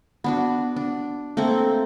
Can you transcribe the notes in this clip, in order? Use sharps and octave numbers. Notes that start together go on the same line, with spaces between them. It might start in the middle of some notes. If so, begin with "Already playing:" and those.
B3 D4 F#4
D4
A3 A#3 C4 A4